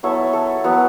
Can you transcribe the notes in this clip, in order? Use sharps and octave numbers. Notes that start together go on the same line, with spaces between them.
F#3 B3 E4 A4 C#5
A4
F#3 B3 E4